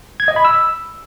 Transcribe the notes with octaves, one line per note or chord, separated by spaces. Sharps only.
G#6
D#5
B5
E6